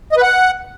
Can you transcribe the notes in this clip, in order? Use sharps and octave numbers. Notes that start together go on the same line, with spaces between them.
D#5
B4
F#5